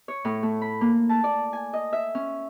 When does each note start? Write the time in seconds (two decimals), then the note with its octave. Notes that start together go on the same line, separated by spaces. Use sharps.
0.08 C#5
0.25 A2
0.43 A3
0.61 B5
0.81 A#3
1.09 A5
1.24 D5
1.53 G#5
1.73 D#5
1.93 E5
2.15 C#4